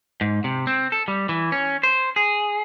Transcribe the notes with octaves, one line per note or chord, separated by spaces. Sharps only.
G#2
C3
C4
A4
G3
E3
C#4
C5
G#4